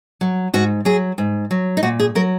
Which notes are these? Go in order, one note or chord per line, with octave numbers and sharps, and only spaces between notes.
F#3
G#2 F#4
F#3 G#4
G#2
F#3
D#4
A#2 F#4
G#4
F#3 A#4